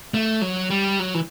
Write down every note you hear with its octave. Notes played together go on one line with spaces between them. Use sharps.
A3
F#3
G3
F#3
E3